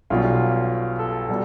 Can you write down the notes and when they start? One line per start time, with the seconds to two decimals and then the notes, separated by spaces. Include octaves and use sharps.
0.10 B1 B2 G3 F4
0.99 A4
1.29 B2 G3